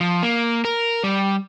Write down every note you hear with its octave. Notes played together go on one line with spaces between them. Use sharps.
F3
A#3
A#4
G3